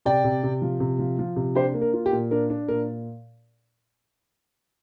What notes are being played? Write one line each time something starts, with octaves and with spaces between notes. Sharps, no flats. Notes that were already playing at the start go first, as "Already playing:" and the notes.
C3 D5 G5
C3
C3
F3
C3
F3
F3
C3
D4 G4 C5
A#3
A#4
F4
G4
A#2
D4 A#4
D4
A#2 A#4